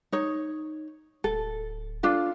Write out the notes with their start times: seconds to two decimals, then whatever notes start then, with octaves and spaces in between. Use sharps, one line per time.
0.12 D#4 C#5
1.24 D1 A4
2.03 D4 F4 A4